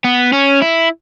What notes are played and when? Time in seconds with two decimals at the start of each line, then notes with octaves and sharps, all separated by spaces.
0.04 B3
0.33 C#4
0.62 E4